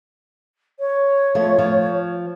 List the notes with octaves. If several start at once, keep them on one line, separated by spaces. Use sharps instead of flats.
C#5
F3 A3
F3